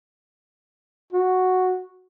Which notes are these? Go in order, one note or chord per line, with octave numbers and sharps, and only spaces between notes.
F#4